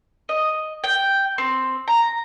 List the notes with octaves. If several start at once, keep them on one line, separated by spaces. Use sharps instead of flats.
D#5
G5
C4
A#5